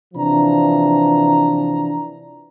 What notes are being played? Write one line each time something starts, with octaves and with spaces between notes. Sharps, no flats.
C3 E3 F3 D4 A#5